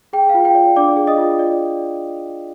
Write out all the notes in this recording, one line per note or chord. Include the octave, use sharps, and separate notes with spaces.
G#4 G5
F4 F5
G5
D5
D4 D5 D6
G#4
D#5 D#6
F4
D5